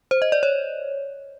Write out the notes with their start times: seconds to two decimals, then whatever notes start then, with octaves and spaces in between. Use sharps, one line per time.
0.11 C5
0.22 D#5
0.32 D5
0.43 C#5